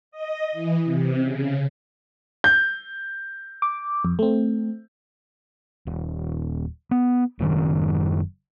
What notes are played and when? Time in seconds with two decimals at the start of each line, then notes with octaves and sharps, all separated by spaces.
0.11 D#5
0.52 E3
0.84 C3
1.21 C#3
2.44 G6
3.62 D6
4.05 F2
4.19 A3 C4
5.87 D#1
6.91 B3
7.39 F#1 F#2 A2 D#3